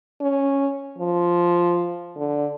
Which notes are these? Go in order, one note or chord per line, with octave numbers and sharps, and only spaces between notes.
C#4
F3
D3